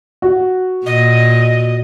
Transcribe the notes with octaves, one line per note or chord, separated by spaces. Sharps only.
F#4
A#2 D#5